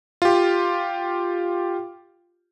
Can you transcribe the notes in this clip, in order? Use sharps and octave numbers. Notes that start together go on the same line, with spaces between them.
F4 G4